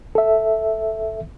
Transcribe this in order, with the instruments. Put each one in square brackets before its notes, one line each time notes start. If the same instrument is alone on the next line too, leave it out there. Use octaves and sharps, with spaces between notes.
[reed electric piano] A4 E5